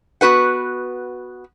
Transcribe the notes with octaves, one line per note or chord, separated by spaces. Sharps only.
B3 F#4 B4 F#5